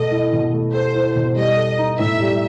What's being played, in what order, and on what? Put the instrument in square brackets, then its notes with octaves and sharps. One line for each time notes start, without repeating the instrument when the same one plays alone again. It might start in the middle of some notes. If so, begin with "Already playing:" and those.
Already playing: [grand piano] B2 A3 A4 [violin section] D#5
[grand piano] E4
B2
A3
[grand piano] A4 [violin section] C5
[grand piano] E4
B2
[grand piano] G3 [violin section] D#5
[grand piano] A4
D#4
[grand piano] A2 [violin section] E5
[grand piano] G3